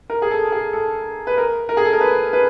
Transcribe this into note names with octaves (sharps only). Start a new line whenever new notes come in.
A#4
G#4
A4
G#4
A4
B4
A#4
A#4
G#4
A4
A#4
B4
B4